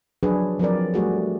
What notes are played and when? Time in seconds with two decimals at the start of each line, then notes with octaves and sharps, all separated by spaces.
0.23 F3 F#3 D4 G#4 B4
0.59 F3 F#3 C4 A#4 D5
0.94 G3 A3 F#4 G#4